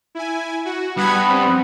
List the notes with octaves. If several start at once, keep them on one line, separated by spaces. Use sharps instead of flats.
E4 G#5
F#4
G2 B3 F#5 B5 G#6
C4